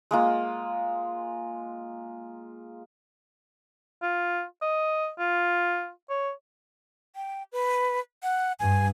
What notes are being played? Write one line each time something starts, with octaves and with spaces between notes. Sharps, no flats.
G#3 A#3 F4
F4
D#5
F4
C#5
G5
B4
F#5
G2 G#5